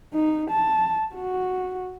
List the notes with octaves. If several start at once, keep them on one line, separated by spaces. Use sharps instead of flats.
D#4
A5
F#4